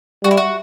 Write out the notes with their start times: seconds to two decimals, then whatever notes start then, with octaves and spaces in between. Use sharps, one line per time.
0.24 G3 F#4
0.31 E4
0.37 F#4